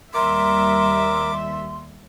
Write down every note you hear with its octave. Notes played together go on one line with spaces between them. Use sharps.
D#2 G3 A#4 E5 C6 D6